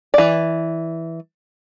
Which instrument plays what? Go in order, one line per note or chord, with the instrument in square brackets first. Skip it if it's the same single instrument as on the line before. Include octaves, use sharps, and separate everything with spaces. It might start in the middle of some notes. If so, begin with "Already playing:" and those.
[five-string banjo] E3 D5